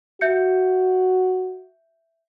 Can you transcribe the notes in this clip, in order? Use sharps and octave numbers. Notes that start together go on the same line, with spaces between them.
F#4 E5 G6 C#7